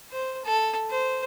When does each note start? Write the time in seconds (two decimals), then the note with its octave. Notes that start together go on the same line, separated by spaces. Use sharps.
0.11 C5
0.45 A4
0.90 C5